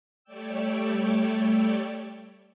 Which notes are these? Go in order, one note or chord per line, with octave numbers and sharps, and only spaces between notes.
G3 A3 C#5 D5 G5 E6